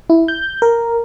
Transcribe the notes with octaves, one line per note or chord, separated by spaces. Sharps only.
E4
G6
A#4